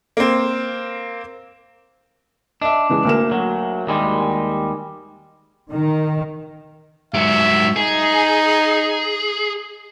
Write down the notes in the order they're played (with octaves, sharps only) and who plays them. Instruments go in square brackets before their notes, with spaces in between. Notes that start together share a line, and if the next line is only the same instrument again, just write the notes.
[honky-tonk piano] A#3 C4
[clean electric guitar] D4 [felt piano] D#5 E5
[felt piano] C#3 E3 G#3
D2 A#3 E7
[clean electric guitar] F#3
D#2 G3 G#3
[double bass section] D#3
[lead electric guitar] G#2 F#3 [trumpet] E5
[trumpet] D#4 [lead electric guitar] G#4